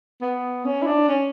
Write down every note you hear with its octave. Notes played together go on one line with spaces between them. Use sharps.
B3
C#4
E4
D4
C#4